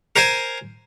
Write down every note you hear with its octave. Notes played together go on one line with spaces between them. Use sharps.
A#4 C5 G#5